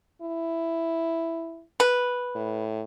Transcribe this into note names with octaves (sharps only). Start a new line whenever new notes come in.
E4
B4
A2